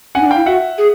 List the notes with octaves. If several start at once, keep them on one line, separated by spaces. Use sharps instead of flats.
C#4 F#5 G#5
D#4
D4
F5 G5
E4
F#4 E5 F#5
G#4